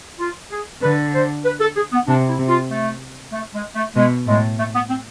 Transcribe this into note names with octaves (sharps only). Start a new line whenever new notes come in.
F4
G#4
D3 B4
C5
B4
A4
G#4
B3
C3 D4
E4
C3
F4
A3
A3
G#3
A3
B2 G#3
A2 G#3
A3
B3
C4